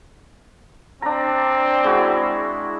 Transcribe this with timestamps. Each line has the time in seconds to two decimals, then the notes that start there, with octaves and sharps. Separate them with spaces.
1.02 C4 D4 A#5
1.84 G#3 E4 F#4